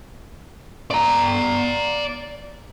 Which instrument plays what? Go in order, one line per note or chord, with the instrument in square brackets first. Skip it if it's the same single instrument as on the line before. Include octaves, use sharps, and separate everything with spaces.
[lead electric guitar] D5 A#5